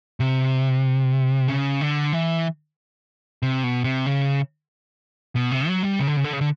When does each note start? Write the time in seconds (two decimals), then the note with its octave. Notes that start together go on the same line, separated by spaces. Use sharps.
0.20 C3
1.48 C#3
1.81 D3
2.13 E3
3.42 C3
3.64 B2
3.84 C3
4.06 C#3
5.36 B2
5.51 C3
5.68 F#3
5.83 G3
5.99 C#3
6.07 D3
6.17 C#3
6.24 D3
6.33 C#3
6.41 D3